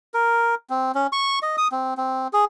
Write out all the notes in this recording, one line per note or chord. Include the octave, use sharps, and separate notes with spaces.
A#4
C4
C#4
C#6
D#5
D#6
C4
C4
G#4